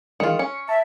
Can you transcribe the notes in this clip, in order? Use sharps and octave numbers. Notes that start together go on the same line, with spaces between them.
D#3 E3 G#3 F4 C#7
C#4 C#7
E5 A5